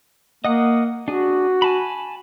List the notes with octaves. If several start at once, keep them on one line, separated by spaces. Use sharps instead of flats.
A#3 D#5 F#5 D#6
D4 F#4 G#4
G#5 A5 B5